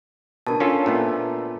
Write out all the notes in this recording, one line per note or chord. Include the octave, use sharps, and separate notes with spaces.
B2 D4 A#4 A5
C#4 F4 A4
A#2 A3 B3